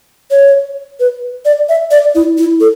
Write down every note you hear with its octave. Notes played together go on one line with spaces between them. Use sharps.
C#5
B4
D5
E5
D5
E4
E4
A4